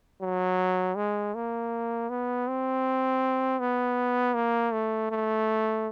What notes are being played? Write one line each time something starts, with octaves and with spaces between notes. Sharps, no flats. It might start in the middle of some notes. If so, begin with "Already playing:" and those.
F#3
G#3
A#3
B3
C4
B3
A#3
A3
A3